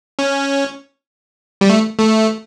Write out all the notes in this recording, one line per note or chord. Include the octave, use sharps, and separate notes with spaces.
C#4
G3
A3
A3